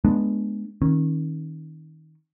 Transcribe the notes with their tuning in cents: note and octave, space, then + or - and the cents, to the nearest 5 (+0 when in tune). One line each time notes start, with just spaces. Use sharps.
G#3 +15 B3 -15 D4 +0
D#3 +15 C#4 -30